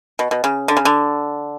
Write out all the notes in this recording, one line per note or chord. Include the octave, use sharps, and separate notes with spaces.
B2
B2
C#3
D3
C#3
D3